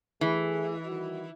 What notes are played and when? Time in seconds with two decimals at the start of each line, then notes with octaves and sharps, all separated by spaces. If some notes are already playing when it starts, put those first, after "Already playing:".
0.21 E3 A3 G#4
0.86 D#3 G3 F#4